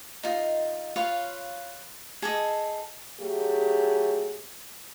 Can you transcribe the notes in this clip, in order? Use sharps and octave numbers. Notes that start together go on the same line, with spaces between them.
D#4 F4 D#5
F4 B4 C#5 F5
G#4 A4 D#5
F#3 A3 G4 G#4